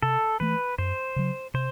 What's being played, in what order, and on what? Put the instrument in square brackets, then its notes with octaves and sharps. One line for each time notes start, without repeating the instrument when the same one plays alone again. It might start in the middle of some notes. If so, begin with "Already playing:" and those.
[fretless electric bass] C3 [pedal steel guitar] A4
[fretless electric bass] E3 A3 [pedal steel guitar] B4
[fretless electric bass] F#2 [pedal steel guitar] C5
[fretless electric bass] C#3 F#3
[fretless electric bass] C3 [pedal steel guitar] C5